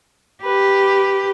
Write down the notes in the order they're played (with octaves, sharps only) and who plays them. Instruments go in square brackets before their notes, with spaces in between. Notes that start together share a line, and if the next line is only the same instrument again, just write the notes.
[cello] G4 [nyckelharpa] B4